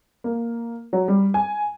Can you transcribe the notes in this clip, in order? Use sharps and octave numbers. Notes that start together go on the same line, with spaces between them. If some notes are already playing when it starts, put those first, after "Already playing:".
A#3
F#3
G3
G#5